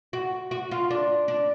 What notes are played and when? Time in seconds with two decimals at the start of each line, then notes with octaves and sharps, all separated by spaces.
0.13 F#4
0.51 F#4
0.71 F4
0.91 D4
1.28 D4